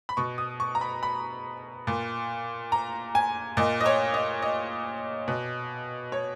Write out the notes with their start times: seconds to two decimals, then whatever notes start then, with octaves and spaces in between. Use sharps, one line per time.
0.09 B5
0.17 B2 C#6
0.38 D#6
0.60 C#6
0.75 A#5
0.81 B5
1.03 B5
1.87 A#2
2.72 A#5
3.15 G#5
3.57 A#2 D#5
3.81 D#5
3.86 C#5
4.14 D#5
4.42 D#5
5.28 B2
6.12 C#5